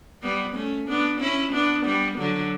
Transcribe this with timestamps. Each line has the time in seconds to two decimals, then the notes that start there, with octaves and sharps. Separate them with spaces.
0.22 G3 B3
0.55 A3 C#4
0.88 B3 D4
1.21 C#4 E4
1.53 B3 D4
1.85 G3 B3
2.18 D3 F#3